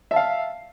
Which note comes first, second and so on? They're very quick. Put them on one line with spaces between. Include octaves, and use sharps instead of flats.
E5 A5 F5